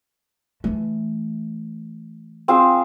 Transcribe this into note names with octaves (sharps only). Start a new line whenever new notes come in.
E3 A3
C4 F4 G#4